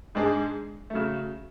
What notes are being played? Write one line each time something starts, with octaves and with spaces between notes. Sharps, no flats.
G#2 G#3 D4 G#4
C#3 F#3 A3